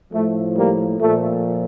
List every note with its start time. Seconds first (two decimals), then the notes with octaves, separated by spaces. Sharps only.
0.13 A2 F3 A3
0.57 G3 A#3
1.01 A#2 F3 A3